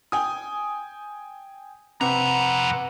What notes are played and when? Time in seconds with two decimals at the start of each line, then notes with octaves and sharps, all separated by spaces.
0.12 G5 G#5 D#6
2.01 F2 C3 B4 F#5 A#5